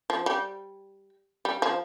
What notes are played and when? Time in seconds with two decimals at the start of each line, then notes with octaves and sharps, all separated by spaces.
0.10 F3
0.26 G3
1.45 G3
1.62 F3